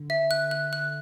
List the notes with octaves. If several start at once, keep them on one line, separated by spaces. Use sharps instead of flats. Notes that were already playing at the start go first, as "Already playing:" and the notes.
Already playing: D3
E5
F#6
F#6
F#6